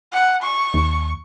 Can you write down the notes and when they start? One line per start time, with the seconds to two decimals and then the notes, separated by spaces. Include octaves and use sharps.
0.13 F#5
0.42 C#6
0.74 D#2